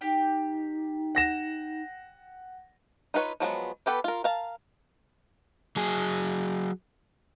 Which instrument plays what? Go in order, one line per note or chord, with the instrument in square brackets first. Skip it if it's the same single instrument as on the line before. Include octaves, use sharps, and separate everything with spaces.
[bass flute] D#4 [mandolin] G4 G5 D6
[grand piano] F#5 A#6 E7
[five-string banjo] D#4 F4 B4 C#5
F3 F#3 G#3 B3
B3 G4 A4 B4
F4 A#4
A#4 F5 A5
[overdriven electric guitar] F#3 G#4